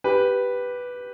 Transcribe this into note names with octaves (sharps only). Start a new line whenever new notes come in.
G4 B4